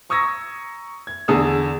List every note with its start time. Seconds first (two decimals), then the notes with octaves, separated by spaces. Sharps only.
0.10 A#5 C#6 D#6 E6 G#6 A#6
1.07 G#6
1.28 E2 D3 G#4 A4 D#6 E6